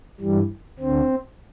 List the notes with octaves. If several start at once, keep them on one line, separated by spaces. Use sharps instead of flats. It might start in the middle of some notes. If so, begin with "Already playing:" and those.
G2 E3 G3
D2 D3 C4